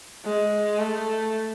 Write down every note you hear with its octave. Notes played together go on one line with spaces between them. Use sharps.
G#3
A3